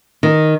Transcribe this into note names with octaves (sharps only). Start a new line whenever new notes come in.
D#3